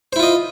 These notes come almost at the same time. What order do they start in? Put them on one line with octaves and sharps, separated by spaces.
C5 E4 F4 D#5